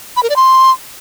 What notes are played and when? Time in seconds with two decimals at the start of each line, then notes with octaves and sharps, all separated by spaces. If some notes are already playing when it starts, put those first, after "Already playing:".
0.16 B5
0.23 A#4
0.29 D5
0.36 C6